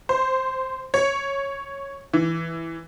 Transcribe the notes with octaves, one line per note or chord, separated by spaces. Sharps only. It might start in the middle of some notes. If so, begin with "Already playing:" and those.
C5
C#5
E3